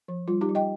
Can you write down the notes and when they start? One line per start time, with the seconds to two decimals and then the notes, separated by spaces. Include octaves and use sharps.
0.08 F3
0.28 G3 F4
0.41 D#4 G4
0.49 G3
0.55 D#5 G5